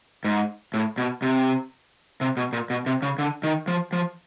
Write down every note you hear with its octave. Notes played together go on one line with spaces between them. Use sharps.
G#2
A2
B2
C3
C3
B2
A#2
B2
C3
C#3
D3
D#3
F3
F3